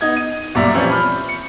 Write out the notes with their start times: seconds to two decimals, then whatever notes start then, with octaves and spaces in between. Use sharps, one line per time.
0.01 B3 D#4 G#6
0.16 D#7
0.55 F#2 A#2 G3 D5 E5 A#5
0.74 E3 F3 G3 C4 C#4 E4
0.90 B5 F6 G6
1.28 C#7